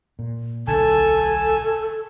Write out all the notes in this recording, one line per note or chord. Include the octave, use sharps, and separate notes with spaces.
A#2
D1 B1 D3 A4 G#5 A5